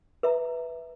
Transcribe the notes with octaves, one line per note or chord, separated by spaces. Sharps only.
B4 E5 A#5